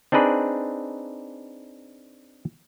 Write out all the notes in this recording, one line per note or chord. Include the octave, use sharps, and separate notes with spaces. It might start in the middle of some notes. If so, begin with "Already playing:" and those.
C4 D4 D#4 G#4 B4 D5